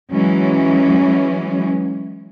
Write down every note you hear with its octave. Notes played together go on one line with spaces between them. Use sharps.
E3 F#3 G#3 C#4